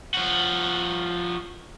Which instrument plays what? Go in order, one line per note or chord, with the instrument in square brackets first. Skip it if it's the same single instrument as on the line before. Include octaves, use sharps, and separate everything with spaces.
[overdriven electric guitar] F3 F#4